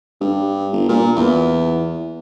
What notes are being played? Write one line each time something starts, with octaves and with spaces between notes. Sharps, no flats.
G2
G1
A#2
E2